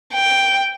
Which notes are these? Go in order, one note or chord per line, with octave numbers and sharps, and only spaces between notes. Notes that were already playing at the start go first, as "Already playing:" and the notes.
G5